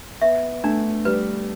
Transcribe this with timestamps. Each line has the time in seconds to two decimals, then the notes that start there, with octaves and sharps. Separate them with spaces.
0.21 B3 E5
0.64 A3 D4
1.05 G3 B4